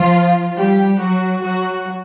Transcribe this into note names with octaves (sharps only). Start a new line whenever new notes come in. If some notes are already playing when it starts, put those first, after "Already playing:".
Already playing: F3 F4
G3 G4
F#3 F#4
F#3 F#4